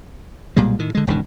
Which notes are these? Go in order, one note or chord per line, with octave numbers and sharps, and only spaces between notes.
B1 A#2 G3 G#3
A2 D#3
D3 G#3
E1 C#2 G2 D#3